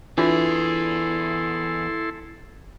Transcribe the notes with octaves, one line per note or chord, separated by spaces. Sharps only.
E2 E3 D4 E4 F4 G#4 A4 C6